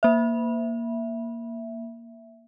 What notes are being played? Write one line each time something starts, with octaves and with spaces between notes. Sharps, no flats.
A#3 E5